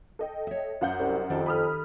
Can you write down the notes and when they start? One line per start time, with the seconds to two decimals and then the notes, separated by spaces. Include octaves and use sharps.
0.19 A4 D#5 G5
0.47 C#5 E5
0.81 F#2 F#5 G6
0.99 C2
1.30 F2 D#3 G4 A4
1.46 B5 D#6 F6